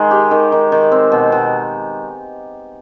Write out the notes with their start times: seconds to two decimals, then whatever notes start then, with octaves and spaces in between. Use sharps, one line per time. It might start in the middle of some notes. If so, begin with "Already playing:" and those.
Already playing: D#3 G#3
0.11 G4
0.31 D#3
0.52 D#3
0.72 D#3
0.92 C4
1.12 B2
1.32 B2